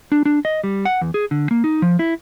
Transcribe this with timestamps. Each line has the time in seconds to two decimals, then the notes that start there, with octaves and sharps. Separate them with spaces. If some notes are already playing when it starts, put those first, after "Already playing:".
0.12 D4
0.25 D4
0.45 D#5
0.64 G3
0.85 F#5
1.01 E2
1.14 G#4
1.31 D3
1.51 A#3
1.64 D#4
1.82 F3
1.99 E4